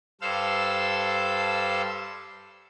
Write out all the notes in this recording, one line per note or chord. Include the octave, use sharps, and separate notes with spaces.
G2 A4 C5 F5 E6